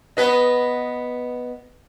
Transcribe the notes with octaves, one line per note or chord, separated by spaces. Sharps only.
B3 B4 D#5